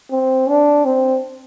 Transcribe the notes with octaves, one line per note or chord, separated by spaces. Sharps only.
C4
D4
C4